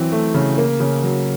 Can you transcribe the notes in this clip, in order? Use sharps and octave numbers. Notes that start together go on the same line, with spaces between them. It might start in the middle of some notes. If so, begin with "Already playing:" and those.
Already playing: E3 F#3 C4
A3
C#3
A#3
C#3
F#3